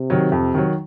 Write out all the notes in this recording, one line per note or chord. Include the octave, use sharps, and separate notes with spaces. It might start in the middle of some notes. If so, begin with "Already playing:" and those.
Already playing: C3
D#3 F#3
F2
D#3 F#3